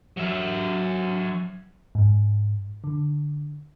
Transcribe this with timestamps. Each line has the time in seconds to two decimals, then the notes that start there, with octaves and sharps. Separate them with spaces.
0.17 F#3 E5
1.95 G#2
2.84 D3